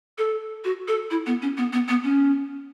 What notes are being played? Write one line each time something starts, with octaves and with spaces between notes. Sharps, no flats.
A4
F#4
A4
E4
B3
C#4
B3
B3
B3
C#4